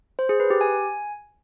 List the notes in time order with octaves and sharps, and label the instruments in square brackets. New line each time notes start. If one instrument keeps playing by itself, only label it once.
[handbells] C5
G#4
B4
G4
G#5